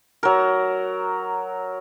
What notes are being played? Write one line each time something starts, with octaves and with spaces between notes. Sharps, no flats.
F#3 A#4